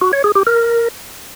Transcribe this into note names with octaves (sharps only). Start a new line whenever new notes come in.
F#4
C#5
G#4
G4
A#4